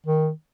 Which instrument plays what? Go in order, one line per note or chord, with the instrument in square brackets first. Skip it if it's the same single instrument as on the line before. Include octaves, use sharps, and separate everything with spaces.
[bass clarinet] D#3